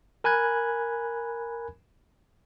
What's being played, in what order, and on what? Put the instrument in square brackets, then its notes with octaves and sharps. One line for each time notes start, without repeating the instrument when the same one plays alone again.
[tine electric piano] A#4 G#5 B5 F#6 G#6